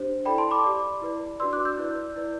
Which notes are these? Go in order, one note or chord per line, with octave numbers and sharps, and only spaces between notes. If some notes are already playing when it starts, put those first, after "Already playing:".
Already playing: D4 G4 C5
E4 A4 D5 G5 B5
A5 C6
B5 D6
G4 D5
E4 B4 D5
D4 F#4 B4 D5 C6 E6
D6 F#6
E6 G6
E4 B4 D5
E4 B4 D5